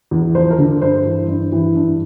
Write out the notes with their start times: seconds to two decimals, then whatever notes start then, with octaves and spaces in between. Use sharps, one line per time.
0.11 E2
0.35 F3 C5
0.50 A#4
0.58 D3
0.82 G2 C5
1.06 E3
1.28 G2
1.52 E3
1.75 G2